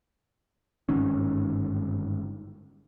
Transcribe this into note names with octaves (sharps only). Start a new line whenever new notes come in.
G1 G#2 D#3 C#4